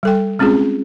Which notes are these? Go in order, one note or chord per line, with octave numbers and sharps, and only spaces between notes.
G3 A4 G5
G#3 C4 C#4 F4 G#4